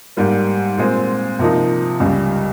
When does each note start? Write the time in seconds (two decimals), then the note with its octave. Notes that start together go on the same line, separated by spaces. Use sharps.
0.17 G#2 G3 A#3
0.78 A#2 G#3 C4
1.39 C3 F3 A#3 D#4
2.00 C#2 C#3 G3